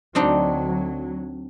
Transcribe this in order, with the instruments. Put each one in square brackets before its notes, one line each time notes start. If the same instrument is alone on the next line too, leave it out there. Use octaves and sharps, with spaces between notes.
[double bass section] D2 F#3 [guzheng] C4 D4 D#4